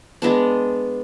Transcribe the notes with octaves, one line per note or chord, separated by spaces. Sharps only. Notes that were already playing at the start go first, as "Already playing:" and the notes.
G#3 B3 D4